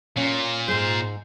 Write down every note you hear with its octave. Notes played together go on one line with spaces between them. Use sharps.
A#2 C#4
G#2 G#3 C5